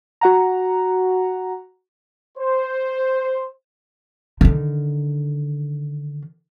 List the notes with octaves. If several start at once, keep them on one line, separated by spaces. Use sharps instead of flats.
F#4 F#5 A#5
C5
D3 D#3